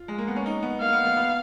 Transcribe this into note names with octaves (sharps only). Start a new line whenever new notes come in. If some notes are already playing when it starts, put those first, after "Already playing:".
Already playing: F4
G#3
A#3
B3
C#4
D#4
B3
A#3 F5
B3
B3
B3